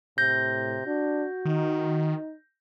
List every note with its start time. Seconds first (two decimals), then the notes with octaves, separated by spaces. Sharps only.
0.18 A2 C3 G6 A#6
0.86 D4 F#4
1.45 D#3 D#4